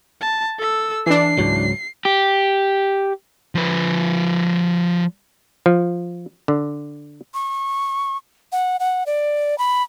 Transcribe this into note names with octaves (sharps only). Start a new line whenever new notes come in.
A5
A4 E6
E3 D4 C7
C#2 G#2 F#3
G4
F3 B4
F3
D3
C#6
F#5
F#5
D5
B5